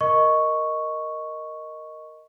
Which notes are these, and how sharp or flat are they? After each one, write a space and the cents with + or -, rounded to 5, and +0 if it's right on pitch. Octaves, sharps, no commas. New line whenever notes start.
A#4 +0 D#5 +0 C#6 +0